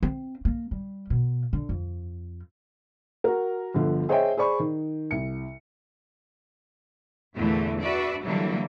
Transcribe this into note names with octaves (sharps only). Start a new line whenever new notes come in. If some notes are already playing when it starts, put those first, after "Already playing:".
C4
A#3
G3
B2
D3
F2
F#4 A#4
G1 D3 F3
G#4 C5 C#5 D#5 E5 G5
G#4 C5 D5 B5 C#6
D#3
C2 C#7
E2 A#2 D3 E3 A3
D4 F#4 B4 D5 E5
D3 E3 F#3 G3 A#3